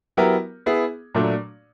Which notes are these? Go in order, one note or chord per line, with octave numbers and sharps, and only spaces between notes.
F#3 B3 E4 G4 A#4
B3 E4 G#4
A#2 F#3 A3 D4